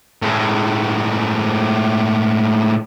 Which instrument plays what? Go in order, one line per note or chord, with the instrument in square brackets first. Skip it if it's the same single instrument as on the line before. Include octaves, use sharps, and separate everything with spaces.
[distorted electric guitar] A2 G#3